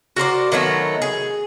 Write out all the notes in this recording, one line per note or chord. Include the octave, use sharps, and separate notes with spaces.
F#4 A#4 C5 D5
D#3 F#3 A3 B3
G#4